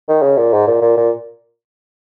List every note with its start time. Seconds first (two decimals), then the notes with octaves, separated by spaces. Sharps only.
0.09 D#3
0.22 C#3
0.37 A#2
0.53 G#2
0.67 A#2
0.82 A#2
0.97 A#2